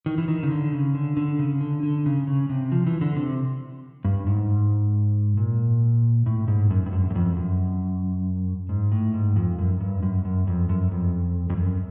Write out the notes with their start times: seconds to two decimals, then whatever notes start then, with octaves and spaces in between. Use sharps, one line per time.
0.06 D#3
0.18 E3
0.28 D#3
0.43 C#3
0.51 D3
0.72 C#3
0.95 D3
1.17 D3
1.39 C#3
1.61 D3
1.83 D3
2.06 C#3
2.27 C#3
2.49 C3
2.72 F3
2.87 E3
3.01 D3
3.16 C3
4.05 G2
4.27 G#2
5.37 A#2
6.26 A2
6.48 G#2
6.70 F#2
6.86 G2
6.92 F#2
7.10 F#2
7.15 F2
7.36 F#2
8.69 G#2
8.92 A2
9.14 G#2
9.36 F2
9.58 F#2
9.81 G2
10.03 F#2
10.25 F#2
10.47 F2
10.69 F#2
10.91 F2
11.50 F2
11.57 F#2